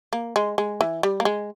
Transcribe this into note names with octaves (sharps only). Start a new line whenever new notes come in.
A#3
G#3
G#3
E3
G3
A#3
G#3